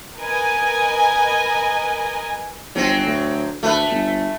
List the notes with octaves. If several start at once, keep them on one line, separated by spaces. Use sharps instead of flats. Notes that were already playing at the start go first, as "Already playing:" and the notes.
A#4 B4 D#5 G#5
G1 F#3 C4
D2
D2 A3 B4
G1